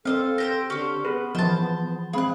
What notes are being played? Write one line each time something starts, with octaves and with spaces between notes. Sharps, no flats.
C4 A4 C5 D#5 F5
G4 C5 G5 A#6
D3 C#4 G4 C5 C#6
B3 G#4 B4
E3 F3 C5 A5
G#3 C4 G#4 F5 B5 F#6